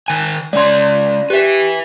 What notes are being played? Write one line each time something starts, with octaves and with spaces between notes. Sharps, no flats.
D#3 G#5
G#3 C#4 C#5 D5 C6
G4 B4 E5